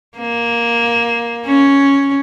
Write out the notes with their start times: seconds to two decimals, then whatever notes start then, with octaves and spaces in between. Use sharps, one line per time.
0.18 A#3
1.46 C#4